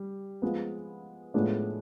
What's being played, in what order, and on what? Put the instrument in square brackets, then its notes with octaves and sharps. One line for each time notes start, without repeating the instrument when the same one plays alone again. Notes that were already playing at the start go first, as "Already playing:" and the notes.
Already playing: [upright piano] G3
F3 G#3 B3
A2 F3 G#3 B3 D4